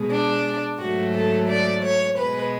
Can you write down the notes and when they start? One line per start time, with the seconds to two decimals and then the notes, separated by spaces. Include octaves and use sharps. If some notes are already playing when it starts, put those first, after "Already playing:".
Already playing: B2 G#3
0.10 D4
0.79 G#2 F#3 A3 F#4
1.14 A4
1.48 D5
1.82 C#5
2.17 B2 G#3 B4